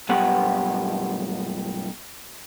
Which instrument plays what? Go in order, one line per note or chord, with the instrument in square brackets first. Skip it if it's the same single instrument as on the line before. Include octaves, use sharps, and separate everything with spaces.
[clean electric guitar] B1 G2 B3 G4 F#5